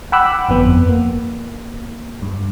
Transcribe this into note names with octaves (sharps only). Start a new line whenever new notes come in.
F#5 G5 B5 D6 E6 F#6
G1 F2 B3
A#3
G2